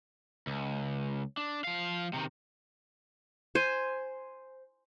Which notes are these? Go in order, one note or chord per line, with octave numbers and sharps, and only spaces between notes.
C#2
D4
F3 F5
C3 D#3
C5 G#5